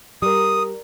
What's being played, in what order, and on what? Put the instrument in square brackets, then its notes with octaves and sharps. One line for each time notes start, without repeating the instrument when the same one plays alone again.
[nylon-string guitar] G3 [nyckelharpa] A#4 [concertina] D#6